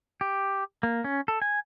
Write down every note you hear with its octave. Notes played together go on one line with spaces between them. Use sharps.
G4
A#3
C#4
A4
G#5